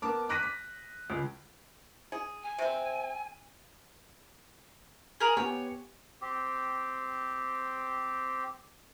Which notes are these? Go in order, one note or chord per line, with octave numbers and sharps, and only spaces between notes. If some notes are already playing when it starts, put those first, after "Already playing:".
B3 A#4 A5 D6
D6 F#6 A#6 B6 D#7
B6
C#2
G#4
G#5
C3 C4
G#4 A#4
B3 G4 C#5 G#5
C4 G4